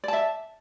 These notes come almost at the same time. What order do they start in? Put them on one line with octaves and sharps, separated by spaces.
D5 A5 E5